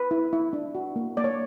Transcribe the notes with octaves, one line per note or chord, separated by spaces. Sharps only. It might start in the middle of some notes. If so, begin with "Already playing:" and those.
Already playing: B4
E4
E4
D4
F#4
A#3
A#3 D5
C#5